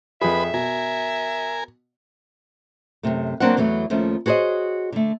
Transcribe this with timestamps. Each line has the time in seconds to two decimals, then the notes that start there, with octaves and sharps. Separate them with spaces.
0.22 F2 G#4 B4 E5 B5
0.54 B2 A#4 G#5
3.03 F#2 A2 C3 A3
3.40 F#3 A#3 C4 D4 C5 F#5
3.57 E2 E3 F#3 A3
3.90 D#2 F3 A3 C#4
4.26 F#4 G#4 C5 C#5 D#5
4.92 D3 A3